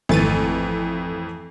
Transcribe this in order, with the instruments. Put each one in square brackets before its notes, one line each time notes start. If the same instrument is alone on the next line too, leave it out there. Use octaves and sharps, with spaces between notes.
[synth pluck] G#1 A6 D#7 [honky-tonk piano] F2 E3 A3